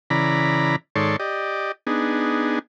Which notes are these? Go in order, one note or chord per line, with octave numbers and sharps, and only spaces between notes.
C#3 E3 D5 A#5 B5
G#2 D#3 A4 C#5 D5 C6
G4 D5 D#5
B3 D4 D#4 G#4